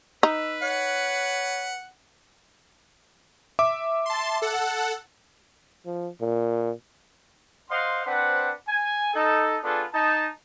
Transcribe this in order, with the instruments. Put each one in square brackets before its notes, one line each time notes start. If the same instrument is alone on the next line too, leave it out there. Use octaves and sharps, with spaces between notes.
[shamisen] D#4 [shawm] B4 [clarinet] E6
[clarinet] C#5 [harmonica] F#5
[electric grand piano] E5 D6
[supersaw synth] A5 C6
A4 F#5
[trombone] F3
A#2
[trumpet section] C5 D#5 F5 F#5 C6
C4 D4 B4 C5 F#5
G#5
D#4 A4
B3 D4 F4 G#4 A4 B4
D#4 A5